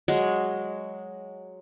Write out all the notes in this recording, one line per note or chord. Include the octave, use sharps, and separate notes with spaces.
F#3 G#3